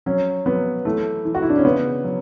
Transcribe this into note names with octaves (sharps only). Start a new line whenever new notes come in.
F#3 C#4
F#3 B3
E3 A3
E3
F#4
E4
D4
C#4
C#3 B3
F#3